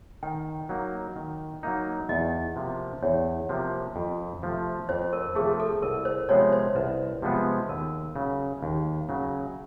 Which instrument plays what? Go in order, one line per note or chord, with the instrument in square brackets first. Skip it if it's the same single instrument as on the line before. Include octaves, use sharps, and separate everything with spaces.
[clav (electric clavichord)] D#3 [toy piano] G5
[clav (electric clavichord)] F#3 A#3 D#4
D#3
F#3 A#3 D#4
[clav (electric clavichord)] E2 [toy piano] D#5
[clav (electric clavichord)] C3 F3 A#3
[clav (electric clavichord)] E2 [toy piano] C#5
[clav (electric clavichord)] C3 F3 A#3
F2
C3 F3 A3
[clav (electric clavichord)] F2 [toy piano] C5
[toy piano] A#4
[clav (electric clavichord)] C3 F3 A3 [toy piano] G#4
[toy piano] A4
[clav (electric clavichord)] C2 [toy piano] A#4
[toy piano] C5
[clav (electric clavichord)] C3 F3 G#3 B3 [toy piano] C#5
[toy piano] C5
[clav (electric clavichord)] C2 [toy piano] B4
[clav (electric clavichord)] C3 F3 G#3 B3
[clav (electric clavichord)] D#2 [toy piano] A#4
[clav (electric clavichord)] C#3 F#3
D#2
C#3 F#3